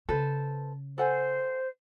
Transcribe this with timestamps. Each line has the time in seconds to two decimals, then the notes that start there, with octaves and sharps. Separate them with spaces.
0.09 C#3 A4 B4 C5
0.98 A4 C5 F#5 G#5